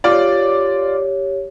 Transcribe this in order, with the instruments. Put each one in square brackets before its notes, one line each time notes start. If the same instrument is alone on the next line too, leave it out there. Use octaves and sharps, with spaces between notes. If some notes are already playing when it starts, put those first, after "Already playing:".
[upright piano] F4 D5 [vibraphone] G4 C#5